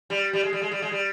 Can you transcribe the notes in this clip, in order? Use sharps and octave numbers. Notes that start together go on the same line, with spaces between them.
G3
G3
G#3
G3
G#3
G3
G#3
G3